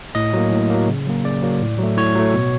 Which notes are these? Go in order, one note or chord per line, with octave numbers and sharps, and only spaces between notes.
A2 D#5
F#3 A#3
A2
F#3 A#3
C#3
F#3 A#3
C#3 D5
F#3 A#3
A2
F#3 A3
A2 C#5
F#3 A3
B2